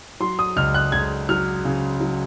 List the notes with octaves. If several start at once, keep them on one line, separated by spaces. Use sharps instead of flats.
F#3 C6
D#6
C#2 F6
F#6
C#2 G#6
F#3 F6
C#3
F#3